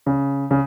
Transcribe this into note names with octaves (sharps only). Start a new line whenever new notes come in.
C#3
C#3